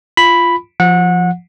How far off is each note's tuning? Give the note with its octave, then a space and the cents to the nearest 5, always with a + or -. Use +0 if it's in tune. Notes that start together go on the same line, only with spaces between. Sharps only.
F4 -10 B5 +0
F3 +0 F#5 -25